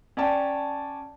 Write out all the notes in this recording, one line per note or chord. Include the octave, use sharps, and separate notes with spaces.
C#4 D5 G5 A5